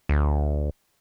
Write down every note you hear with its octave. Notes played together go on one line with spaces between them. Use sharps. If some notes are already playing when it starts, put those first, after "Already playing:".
D2